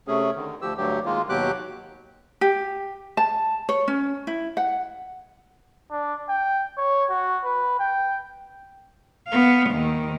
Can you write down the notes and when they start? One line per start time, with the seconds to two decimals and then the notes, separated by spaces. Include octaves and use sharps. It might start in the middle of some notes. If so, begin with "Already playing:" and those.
0.07 C3 A3 C#4 G#4
0.35 D3 D#3
0.62 D2 F3 G4 E6
0.77 D2 G2 F#3 G4
1.06 D#3 G#3 A#3 F4
1.29 D#2 B2 F#3 G4 D6 F#6
2.41 G4
3.17 A5
3.69 C#5
3.88 C#4
4.27 E4
4.57 F#5
5.91 D4
6.29 G5
6.77 C#5
7.10 F#4
7.44 B4
7.80 G5
9.28 B3 F5
9.70 D#2 D#3